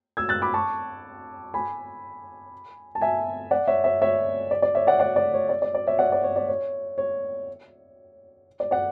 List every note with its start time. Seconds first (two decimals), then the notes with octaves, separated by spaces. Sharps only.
0.17 E6 G#6
0.29 F#6 A6
0.42 B5 D6
0.54 A5 C#6
1.54 G#5 B5
2.95 A5
3.01 E5 G#5
3.51 D5 F#5
3.67 C#5 E5
3.84 C#5 E5
4.02 C#5 E5
4.51 D5
4.62 D5
4.75 C#5 E5
4.87 D5 F#5
5.00 D5 F#5
5.16 D5
5.34 C#5
5.49 D5
5.62 D5
5.74 D5
5.87 C#5 E5
5.99 D5 F#5
6.12 D5
6.23 C#5
6.36 D5
6.49 C#5
6.98 C#5
8.60 D5
8.71 D5 F#5